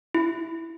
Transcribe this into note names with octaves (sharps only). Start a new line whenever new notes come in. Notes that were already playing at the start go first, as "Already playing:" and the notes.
E4